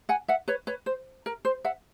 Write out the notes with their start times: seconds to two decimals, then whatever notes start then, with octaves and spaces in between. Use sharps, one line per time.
0.09 F#5 G#5
0.28 E5 F#5
0.48 B4 C#5
0.67 B4 C#5
0.86 C5
1.26 A#4
1.45 C5
1.65 E5 F#5